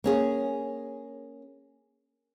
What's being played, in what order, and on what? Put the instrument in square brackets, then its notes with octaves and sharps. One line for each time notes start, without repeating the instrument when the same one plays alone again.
[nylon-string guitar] A#3 C#4 G#4